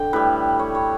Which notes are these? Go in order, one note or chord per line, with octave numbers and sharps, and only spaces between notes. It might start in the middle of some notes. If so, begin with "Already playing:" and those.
Already playing: D3 G5
A2 G3 B4
C#5
C#5